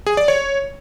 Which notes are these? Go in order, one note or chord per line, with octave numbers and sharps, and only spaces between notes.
G#4
D5
C#5